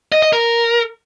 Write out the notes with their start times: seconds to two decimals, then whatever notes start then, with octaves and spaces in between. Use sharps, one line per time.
0.12 D#5
0.22 D#5
0.33 A#4